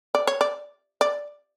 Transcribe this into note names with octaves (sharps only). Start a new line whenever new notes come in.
D5
C#5
D5
D5